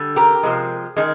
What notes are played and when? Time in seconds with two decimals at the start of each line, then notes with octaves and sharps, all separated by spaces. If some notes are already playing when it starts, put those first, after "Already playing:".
Already playing: D3 G3
0.16 G4 A#4
0.43 C3 F3 G#3
0.97 D#3 G#3